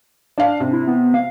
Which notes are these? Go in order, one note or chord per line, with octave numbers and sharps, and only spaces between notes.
D4 D5 F5
C3
E4
B3
F5